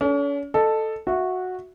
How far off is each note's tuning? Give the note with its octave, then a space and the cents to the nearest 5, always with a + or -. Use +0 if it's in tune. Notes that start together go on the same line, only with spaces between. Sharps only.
C#4 +40 A4 -20
A4 +0 D#5 -25
F#4 -10 E5 +0